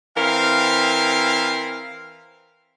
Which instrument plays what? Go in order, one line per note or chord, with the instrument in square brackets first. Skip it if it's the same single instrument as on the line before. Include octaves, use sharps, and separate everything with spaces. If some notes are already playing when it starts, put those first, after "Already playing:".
[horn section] E3 C4 A#4 F5